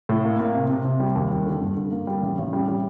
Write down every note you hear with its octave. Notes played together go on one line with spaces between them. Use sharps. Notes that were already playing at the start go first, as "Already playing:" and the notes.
A2
A#3
A#3
C3
C3
C3
G3
D#2
G3
D3
G2
D3
A#3
G3
A1
A1
G3
G3